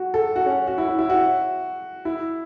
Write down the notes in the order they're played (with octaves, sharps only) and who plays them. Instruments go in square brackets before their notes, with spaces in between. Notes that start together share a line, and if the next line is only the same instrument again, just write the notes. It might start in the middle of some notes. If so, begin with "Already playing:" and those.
Already playing: [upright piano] F#4
A4
F#4
C#4
F#4
E4
E4
E4
F#4
E4